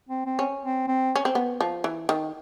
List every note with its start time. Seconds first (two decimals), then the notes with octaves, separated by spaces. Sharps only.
0.09 C4
0.26 C4
0.39 C#4
0.63 C4
0.88 C4
1.16 C#4
1.25 C4
1.35 B3
1.61 F3
1.84 E3
2.09 D#3